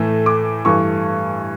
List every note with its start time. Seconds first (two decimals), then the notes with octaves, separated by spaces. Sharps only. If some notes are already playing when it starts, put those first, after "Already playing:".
Already playing: A2 E3 A3
0.26 D6
0.65 G2 E3 A3 C#6